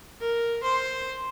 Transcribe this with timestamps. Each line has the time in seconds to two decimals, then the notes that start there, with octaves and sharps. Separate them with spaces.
0.20 A#4
0.63 C5